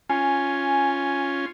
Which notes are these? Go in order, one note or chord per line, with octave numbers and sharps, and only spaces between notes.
C#4 F4 G#5